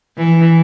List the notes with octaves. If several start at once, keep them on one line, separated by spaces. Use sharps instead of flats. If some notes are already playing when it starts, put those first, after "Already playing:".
E3